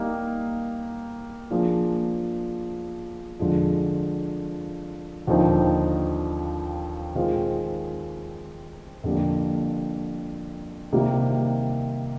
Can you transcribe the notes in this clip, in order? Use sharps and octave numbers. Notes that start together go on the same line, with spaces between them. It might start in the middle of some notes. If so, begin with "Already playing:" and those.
Already playing: G3 A#3 D#4
F3 A#3 D4 F4 G#4
F2 D3 F3 G#3
D#2 D3 F3 C4 D#4
D#3 G#3 C4 F4
F2 D3 G3 A#3
C3 D#3 G3 A#3